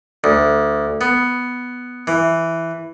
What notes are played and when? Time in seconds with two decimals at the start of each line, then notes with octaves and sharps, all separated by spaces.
0.24 D2
1.01 B3
2.07 E3